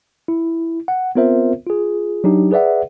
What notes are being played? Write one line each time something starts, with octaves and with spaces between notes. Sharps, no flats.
E4
F#5
B3 C4 F4 A#4 C5 E5
F4 G#4
F#3 D4 D#4 G4
G#4 B4 D5 E5 F#5